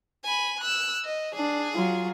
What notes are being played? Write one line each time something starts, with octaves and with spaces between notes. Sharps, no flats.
G#5 B5
E6 F#6
D#5
D4 G#4
F#3 F4